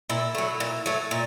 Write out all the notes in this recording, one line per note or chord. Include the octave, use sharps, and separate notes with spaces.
A#2 E4
F#3 A3
A#2
F#3 A3
A#2